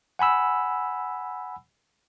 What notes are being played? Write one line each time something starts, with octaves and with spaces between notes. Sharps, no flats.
F#5 G#5 B5 E6